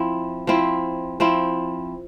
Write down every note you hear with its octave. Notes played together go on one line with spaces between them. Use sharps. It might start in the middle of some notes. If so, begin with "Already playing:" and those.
Already playing: F3 C4 E4
F3 C4 E4
F3 C4 E4